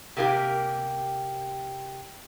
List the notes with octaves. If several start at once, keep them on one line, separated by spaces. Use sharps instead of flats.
C3 A#3 G4